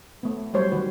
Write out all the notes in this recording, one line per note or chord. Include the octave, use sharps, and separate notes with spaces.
A3 B3
F#3 G3 A#3 C5 C#5
D#3 F#4 B4